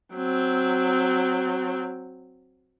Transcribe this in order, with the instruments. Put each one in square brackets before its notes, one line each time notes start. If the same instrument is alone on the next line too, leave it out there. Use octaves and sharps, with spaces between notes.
[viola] F#3 C4